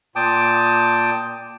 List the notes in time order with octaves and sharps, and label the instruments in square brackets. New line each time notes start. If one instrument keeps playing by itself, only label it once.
[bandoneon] A#2 G5 A5 D6 D#6